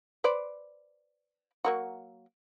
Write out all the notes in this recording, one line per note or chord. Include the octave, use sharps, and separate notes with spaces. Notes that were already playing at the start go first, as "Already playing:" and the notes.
B4 C5 D5
F#3 A#3 F#4